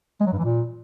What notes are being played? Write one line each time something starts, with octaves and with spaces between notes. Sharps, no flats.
G#3
F#3
G2
E3
A#2